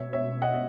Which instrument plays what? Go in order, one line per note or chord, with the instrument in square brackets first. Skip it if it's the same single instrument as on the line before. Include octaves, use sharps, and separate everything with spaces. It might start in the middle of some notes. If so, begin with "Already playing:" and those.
Already playing: [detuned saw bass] B2 [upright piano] C#5 E5
[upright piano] C#5 E5
D#5 F#5
D#5